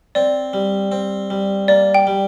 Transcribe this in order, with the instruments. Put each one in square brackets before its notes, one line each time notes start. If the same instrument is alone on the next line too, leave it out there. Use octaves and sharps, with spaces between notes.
[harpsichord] C4 [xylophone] D5
[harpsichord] G3
C4
G3
[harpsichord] A#3 [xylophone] D5
[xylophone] G5
[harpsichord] G3